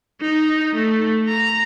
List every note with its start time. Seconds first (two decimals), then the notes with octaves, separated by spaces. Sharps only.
0.21 D#4
0.75 A3
1.28 A#5